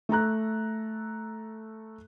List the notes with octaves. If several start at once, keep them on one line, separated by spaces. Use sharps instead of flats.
A3 A4 A#5 F#6